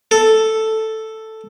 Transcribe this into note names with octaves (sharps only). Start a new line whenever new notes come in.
A4